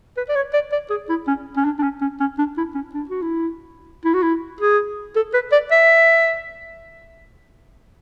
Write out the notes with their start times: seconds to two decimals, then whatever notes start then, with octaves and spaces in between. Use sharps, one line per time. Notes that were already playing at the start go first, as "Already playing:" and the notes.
0.17 B4
0.29 D5
0.36 C#5
0.53 D5
0.72 D5
0.90 G#4
1.09 E4
1.28 C#4
1.57 C#4
1.65 D4
1.79 D4
1.83 C#4
2.01 C#4
2.20 C#4
2.39 D4
2.57 E4
2.75 C#4
2.94 D4
3.10 F#4
3.22 E4
4.05 E4
4.14 F#4
4.23 E4
4.61 G#4
5.16 A4
5.34 B4
5.52 D5
5.71 E5